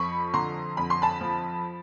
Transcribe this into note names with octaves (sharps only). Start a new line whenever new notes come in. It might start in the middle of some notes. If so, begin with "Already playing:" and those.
Already playing: F2 F3 B5 C#6
D3 A#5 C6
F2 B5
C6
A5 B5
F3